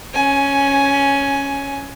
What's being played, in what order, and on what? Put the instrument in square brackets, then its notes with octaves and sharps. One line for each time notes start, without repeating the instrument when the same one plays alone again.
[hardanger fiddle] C#4 G#5